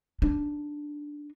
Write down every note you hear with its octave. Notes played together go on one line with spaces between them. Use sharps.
D4 D#4